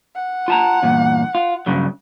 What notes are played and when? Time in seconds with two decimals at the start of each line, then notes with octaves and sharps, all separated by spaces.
0.15 F#5
0.48 F4 A5 A#5
0.83 E2 G2 A#2
1.35 F4
1.66 G2 C#3 F#3